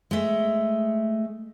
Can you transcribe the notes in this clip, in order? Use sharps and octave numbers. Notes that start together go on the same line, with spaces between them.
G#3 A3